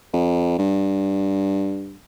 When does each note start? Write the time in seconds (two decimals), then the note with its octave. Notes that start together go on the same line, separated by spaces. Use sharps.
0.13 F2
0.58 G2